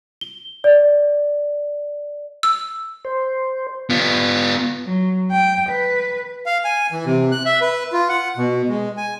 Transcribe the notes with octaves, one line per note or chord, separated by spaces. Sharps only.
G7
D5
E6
C5
B3 F4
F#3
G5
B4
F5
G#5
E3
C3
F#6
E5
B4
F4
F#5
B2
G#3
G#5